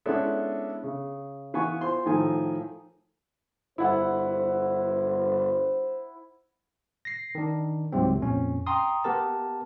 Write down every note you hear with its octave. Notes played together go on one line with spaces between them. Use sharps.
G#3 B3 C#4 D4 E4 A4
C#3
E3 B3 F5 G#5 C#6
F4 C5 C6
A2 D#3 F3 A4 G#5
G1 E4 C5 F#5
A#6 C7
D#3 D4
C#2 G#2 C3 F#3 C4
F2 A#2 C#4
G5 A#5 C6 D#6
B3 G4 A#4 A5